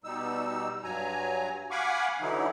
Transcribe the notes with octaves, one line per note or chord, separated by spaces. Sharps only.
B2 G3 D#4 E6
G2 F#3 G#5 A#5
F5 F#5 G#5 B5 C#6 D6
D3 E3 F#3 D#4 E4